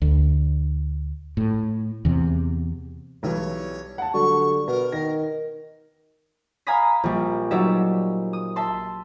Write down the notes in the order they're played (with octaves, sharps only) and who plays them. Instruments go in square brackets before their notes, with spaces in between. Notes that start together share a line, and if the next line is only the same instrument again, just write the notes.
[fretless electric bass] D2
A2
E2 C3
[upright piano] B1 E3 G3 [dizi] C#5
[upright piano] F#5 A5
[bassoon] D3 [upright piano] F#3 G3 [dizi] C#6
[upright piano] B2 [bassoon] B3 [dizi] A#4
[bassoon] D#3 [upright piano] A#6
[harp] F5 G#5 A#5 B5 D#6 B6
A#1 G3
F#3 G3 D#4 D5 E5
D#6
E5 A5 C6